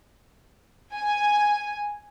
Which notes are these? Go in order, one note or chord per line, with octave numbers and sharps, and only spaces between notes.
G#5